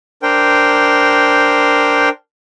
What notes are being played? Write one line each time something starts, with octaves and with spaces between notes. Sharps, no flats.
D4 A#4 C5 G5